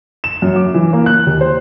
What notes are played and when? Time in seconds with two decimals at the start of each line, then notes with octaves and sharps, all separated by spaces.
0.24 E7
0.42 F#2
0.56 D6
0.74 E3
0.93 A#3
1.06 F#6
1.26 D#2
1.41 C5